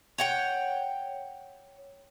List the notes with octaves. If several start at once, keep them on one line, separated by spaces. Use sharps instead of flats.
C#5 F#5 G5